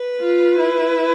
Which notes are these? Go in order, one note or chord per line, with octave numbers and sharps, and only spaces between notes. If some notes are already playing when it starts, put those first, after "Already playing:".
Already playing: B4
F4
E4